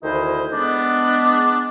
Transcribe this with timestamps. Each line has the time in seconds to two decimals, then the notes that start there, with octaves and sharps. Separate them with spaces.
0.03 D2 D#3 E4 C5 D#5
0.53 G#3 B3 D4